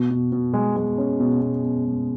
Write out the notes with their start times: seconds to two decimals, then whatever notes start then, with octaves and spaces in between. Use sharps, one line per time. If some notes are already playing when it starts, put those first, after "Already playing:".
Already playing: B2
0.10 B2
0.32 B2
0.54 G#3
0.76 G#3
0.98 C#4
1.20 B2
1.41 B2
1.64 B2
1.85 G#3